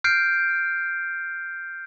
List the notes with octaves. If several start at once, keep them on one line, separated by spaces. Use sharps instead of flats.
F6 G6 C7 D7